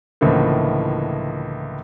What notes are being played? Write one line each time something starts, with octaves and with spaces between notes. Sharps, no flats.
C#2 A2 D3 E3 F3 A#3